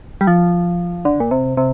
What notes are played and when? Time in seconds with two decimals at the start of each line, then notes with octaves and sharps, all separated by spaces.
0.21 G3
0.27 F3
1.05 D3
1.20 A#2
1.31 C3
1.57 C3